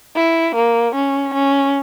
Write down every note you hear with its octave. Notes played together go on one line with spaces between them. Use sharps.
E4
A#3
C#4
C#4